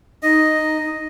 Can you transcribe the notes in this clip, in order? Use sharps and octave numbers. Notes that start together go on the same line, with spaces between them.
D#4 D#5